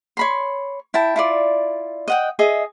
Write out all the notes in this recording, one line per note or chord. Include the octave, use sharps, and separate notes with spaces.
C#5 B5 C6
E4 G5 A5
E4 F4 D5
D#5 F#5 G5
G#4 D#5 E5